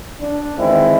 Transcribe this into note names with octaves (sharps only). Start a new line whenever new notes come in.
D4
E2 D3 D#3 G#3 C4 E4